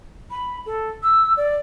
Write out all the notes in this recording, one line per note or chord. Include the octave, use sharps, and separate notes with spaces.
B5
A4
E6
D5